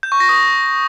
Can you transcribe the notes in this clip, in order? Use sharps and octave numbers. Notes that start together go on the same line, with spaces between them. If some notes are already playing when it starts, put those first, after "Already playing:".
G6
C#6
A#6
D#6